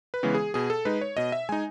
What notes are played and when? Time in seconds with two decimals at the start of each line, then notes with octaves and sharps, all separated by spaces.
0.14 B4
0.23 C#3 E3 G#3 B3
0.35 G#4
0.54 B2 G#4
0.70 A4
0.85 G#3 D#4 B4
1.01 C#5
1.17 B2 D#5
1.32 E5
1.49 G#3 D#4 G#5